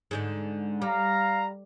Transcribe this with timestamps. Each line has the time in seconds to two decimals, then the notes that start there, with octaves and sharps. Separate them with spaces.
0.11 G#2 D3 G#3
0.82 G3 F5 A#5